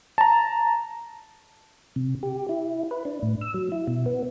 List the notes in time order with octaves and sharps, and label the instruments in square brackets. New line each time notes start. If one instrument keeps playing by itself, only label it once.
[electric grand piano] A5 A#5
[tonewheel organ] C3
G4
E4
B4
D4
A2
E6
F#3
E4
B2
B3